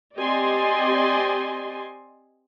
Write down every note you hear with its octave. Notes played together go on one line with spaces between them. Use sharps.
C4 G4 D5 D#5 G#5 C6